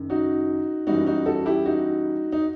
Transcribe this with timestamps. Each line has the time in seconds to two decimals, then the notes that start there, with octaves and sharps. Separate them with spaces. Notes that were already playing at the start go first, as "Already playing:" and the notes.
Already playing: F#1 F#2 D#3
0.10 D#4 F#4
0.87 F#2 E3 G3 D#4 F#4
1.07 D#4 F#4
1.26 F#4 A4
1.46 E4 G4
1.66 D#4 F#4
2.32 D#4